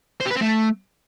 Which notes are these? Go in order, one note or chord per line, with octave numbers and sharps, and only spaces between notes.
C5
G4
B4
C4
A3